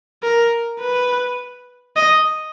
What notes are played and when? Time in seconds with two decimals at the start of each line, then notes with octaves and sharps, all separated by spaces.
0.23 A#4
0.81 B4
1.96 D#5